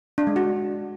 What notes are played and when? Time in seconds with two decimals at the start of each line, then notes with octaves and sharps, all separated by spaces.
0.18 D4
0.27 G#3
0.36 F#4